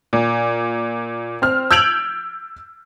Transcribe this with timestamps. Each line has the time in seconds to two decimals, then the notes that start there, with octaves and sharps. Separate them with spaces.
0.13 A#2
1.42 C4 F6
1.71 E6 G6 G#6 D7 F7 F#7